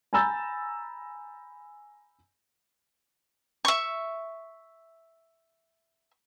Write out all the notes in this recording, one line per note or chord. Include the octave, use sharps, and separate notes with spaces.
G#5 A#5 B5 E6 G6 A6
E5 C#6